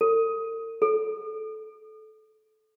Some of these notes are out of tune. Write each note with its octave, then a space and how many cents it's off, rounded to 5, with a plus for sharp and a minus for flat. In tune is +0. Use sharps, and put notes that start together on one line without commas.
A4 +45
A4 -20